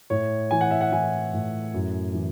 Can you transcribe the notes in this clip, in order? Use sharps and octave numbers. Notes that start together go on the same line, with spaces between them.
A2 C#5
E3 G#5
F#5
E5
F#5
E3 G#5
A2
F#2
E3